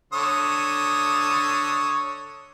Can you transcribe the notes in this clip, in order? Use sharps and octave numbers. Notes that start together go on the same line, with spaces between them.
D3 C#5 D#6